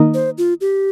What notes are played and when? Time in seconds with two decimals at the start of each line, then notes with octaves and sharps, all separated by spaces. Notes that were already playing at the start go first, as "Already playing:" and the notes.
Already playing: D#3 A#3 D#4
0.14 C5
0.38 F4
0.61 G4